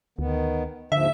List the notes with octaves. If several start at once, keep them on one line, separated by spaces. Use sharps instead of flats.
D2 D#3 B3
D#2 G#2 D3 F3 E5